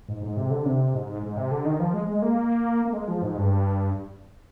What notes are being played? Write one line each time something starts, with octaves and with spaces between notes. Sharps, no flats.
G#2
G#2
C3
D3
C3
G#2
G#2
C3
D3
D#3
F3
G#3
G#3
A#3
A#3
G#3
F3
G#2
G2